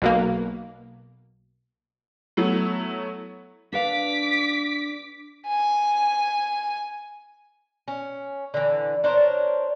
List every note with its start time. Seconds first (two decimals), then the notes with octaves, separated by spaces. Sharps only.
0.02 B1 B2 A#3
2.37 F#3 A3 B3 E4
3.72 D4 B4 F5 D6 B6
5.48 G#5
7.88 C#4
8.54 D3 E3
9.04 D4 A#4 C5 C#5